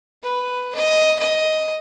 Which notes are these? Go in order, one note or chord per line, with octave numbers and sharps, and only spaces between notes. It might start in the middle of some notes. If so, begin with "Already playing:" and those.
B4
D#5
D#5